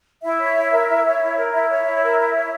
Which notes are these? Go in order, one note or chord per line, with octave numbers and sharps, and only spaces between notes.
E4 E5
C#5
E4
A#4
E4
C#5
E4
A#4
E4 E5
C#5
E4
A#4
E4
C#5